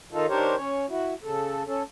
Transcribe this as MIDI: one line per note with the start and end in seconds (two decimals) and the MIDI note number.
0.13 0.26 51
0.13 0.26 63
0.13 0.26 65
0.13 0.26 69
0.29 0.55 51
0.29 0.55 62
0.29 0.55 67
0.29 0.55 70
0.29 0.55 72
0.29 0.55 73
0.56 0.86 61
0.56 0.86 73
0.89 1.14 64
0.89 1.14 66
1.23 1.63 49
1.23 1.63 69
1.67 1.83 61
1.67 1.83 69